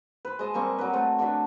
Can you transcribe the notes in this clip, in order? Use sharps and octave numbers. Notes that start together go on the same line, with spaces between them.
B4 C5
G#3 C5 D#5 A5
G3 A#3 C4 C#6
F#3 B4
A3 C4
D3 D4 F#4 B4